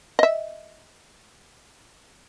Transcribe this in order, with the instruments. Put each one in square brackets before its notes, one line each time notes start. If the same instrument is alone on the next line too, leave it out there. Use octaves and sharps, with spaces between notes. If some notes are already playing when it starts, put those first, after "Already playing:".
[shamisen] D#5 E5